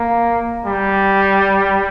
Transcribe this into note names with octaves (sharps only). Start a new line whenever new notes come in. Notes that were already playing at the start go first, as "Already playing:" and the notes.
Already playing: A#3
G3